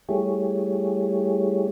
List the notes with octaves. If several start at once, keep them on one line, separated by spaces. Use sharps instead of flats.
G3 A3 E4 G4 G#4 C#5